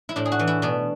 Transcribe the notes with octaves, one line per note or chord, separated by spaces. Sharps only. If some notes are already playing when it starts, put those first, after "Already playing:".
E4
A2 D4
G#4
F#4
E3
E4
B2 D4